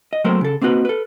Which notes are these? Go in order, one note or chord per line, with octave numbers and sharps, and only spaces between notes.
D#5
F#3 A3 A#3 C4 A#4 C5
C#3 A4
A#3 C4 D#4 F#4 B4
A4 B4